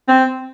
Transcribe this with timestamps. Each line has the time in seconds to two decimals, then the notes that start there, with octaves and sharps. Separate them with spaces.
0.08 C4